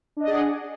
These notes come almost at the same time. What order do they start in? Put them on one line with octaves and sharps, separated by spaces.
D4 D#5 D5 G#4 F#5